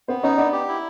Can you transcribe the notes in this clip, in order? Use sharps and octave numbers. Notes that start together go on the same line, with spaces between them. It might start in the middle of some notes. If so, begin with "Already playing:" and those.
B3 C4 C5
C#4 D#4 C#5
B3 D4 D5
G4
E4